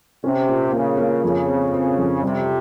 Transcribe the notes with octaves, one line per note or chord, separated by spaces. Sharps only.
C3 C#4
A#2
C#3 A#3
A#3
F2 C#3
C4
C4
F2
C3 G3